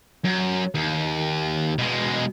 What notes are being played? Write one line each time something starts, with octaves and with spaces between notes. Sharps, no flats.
F#2
D#2
B2 G#3